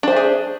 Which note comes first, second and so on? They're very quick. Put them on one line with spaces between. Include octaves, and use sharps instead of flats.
D4 C5 E5 G#4